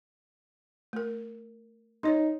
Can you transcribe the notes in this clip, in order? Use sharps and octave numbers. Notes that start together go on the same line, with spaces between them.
A3 A#4
D#4 C#5 D#5 C6